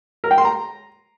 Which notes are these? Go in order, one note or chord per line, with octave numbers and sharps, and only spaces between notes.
A#4
G5
C6
A#5